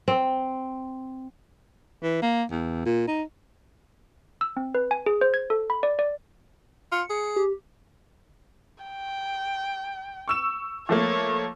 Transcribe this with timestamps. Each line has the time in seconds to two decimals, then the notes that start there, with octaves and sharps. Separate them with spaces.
0.08 C4
2.03 E3
2.22 A#3
2.51 E2
2.86 A#2
3.08 D#4
4.41 E6
4.57 C4
4.75 B4
4.91 G#5
5.06 G#4
5.21 C5
5.34 G#6
5.50 A4
5.70 B5
5.83 D5
5.99 D5
6.92 F4 C#7
7.10 G#4
7.36 G4
8.84 G5
10.28 C#6 E6 E7
10.89 F3 A3 A#3 C#5